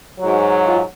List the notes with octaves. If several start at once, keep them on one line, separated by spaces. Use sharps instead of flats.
G#2 F#3 F#4
F4